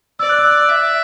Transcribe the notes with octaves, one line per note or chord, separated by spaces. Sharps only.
D5 E6
F#6
E6
E5